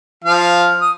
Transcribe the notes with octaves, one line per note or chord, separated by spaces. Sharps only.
F3 F5
D#6